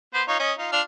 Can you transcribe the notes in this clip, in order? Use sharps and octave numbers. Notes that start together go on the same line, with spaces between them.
B3 C5
D#4 F4 C#5
C#4 D#5 D#6
D#4 F4
D4 F4 F6